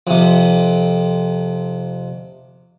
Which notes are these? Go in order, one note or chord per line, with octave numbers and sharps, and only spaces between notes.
F2 C3